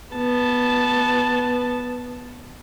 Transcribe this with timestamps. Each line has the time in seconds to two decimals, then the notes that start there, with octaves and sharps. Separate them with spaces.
0.15 B3 A5